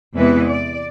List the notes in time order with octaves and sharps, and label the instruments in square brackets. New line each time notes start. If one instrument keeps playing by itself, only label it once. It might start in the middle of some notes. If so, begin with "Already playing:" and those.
[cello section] E2 C3 E3 G#3 B3 B4
D5